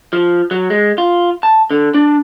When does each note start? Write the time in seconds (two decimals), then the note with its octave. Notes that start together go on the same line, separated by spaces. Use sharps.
0.13 F3
0.51 F#3
0.70 G#3
0.98 F4
1.43 A5
1.71 D3
1.94 D4